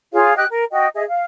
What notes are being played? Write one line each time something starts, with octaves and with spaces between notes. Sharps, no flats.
F4 G#4 C#5 F5
G4 D#5 G5 F#6
A#4
F#4 D#5 G5
G#4 D#5 E5
F5